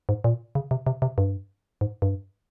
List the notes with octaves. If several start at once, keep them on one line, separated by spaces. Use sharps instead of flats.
G#2
A#2
C#3
C3
C3
C3
G2
G#2
G2